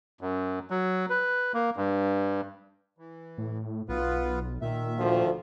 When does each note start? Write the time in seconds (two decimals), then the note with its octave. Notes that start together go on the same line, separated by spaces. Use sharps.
0.21 F#2
0.70 F#3
1.10 B4
1.54 A#3
1.77 G2
2.98 E3
3.38 A2
3.89 B1 B3 F4 B4
4.62 A#2 D#3 E5
4.98 D2 F3